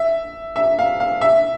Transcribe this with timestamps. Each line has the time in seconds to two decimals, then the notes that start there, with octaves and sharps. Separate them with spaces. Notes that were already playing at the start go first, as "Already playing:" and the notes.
Already playing: E5
0.56 E5
0.79 F5
1.00 F5
1.21 E5